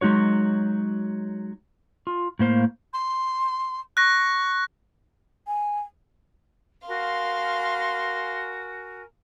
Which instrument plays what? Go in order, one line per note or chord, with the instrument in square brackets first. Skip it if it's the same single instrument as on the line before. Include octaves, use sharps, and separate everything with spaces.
[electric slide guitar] F#3 G#3 D#4 F#4 C#5
F4
A2 A#3 C5 F5
[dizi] C6
[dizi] C#6 [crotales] F#6 A#6
[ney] G#5
[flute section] F#4 A#4 G#5 [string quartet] F5 C6